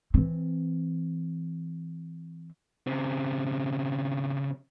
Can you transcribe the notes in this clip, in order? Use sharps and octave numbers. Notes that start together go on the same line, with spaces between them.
E3 C4
C#3 C4